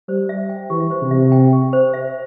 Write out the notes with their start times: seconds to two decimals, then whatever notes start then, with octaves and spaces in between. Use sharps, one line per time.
0.08 G3 C5
0.29 E5
0.49 G5
0.70 E3 G4
0.90 C5
1.01 C3
1.11 E5
1.32 G5
1.53 G4
1.73 C5
1.93 E5